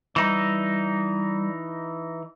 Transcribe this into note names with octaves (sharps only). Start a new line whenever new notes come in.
E3 G3 D#4